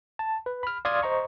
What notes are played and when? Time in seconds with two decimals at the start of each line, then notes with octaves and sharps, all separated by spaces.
0.19 A5
0.46 B4
0.63 B5 F6
0.85 D5 F5 C6 D#6 F6 G#6
1.02 C5 D#5 A#5 C#6